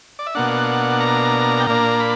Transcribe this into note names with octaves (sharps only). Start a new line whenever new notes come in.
D5
E5
B2 A#3 D4 F#5
A#5
G5
A#2 A#3 D4 A#5
B5